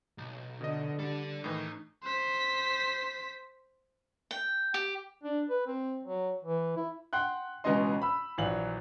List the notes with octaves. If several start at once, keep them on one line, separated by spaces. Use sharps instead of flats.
B1
B2 D3 D#5
G3 D4 A4
A2 D#3 E3 D#4
C5 B6
G5
G4
D4
B4
C4
F#3
E3
E4
F#5 G5 C6 F#6
C#2 B2 E3 C#4 D#5 C6
B5 E6
A#1 E3 F#3 F5 F#7